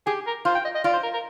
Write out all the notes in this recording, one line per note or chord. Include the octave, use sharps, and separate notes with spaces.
G4 G#4
A#4
F4 C5
G5
D#5
D#5
F4 D5
C5
A#4
A#4